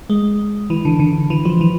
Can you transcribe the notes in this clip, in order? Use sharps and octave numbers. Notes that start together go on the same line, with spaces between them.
G#3
E3
D3
D3
E3
F3
E3